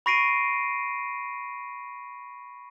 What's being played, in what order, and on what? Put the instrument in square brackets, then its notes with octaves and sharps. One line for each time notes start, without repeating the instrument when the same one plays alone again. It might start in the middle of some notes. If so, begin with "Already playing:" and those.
[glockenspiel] B5 C#6 A#6 C7 D7 D#7